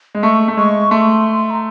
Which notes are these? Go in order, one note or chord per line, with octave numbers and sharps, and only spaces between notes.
G#3
A3 C#6
A3
G#3 C#6
A3 C6
A#5